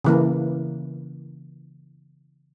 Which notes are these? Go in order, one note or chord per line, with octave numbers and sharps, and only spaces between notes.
C#3 E3 A#3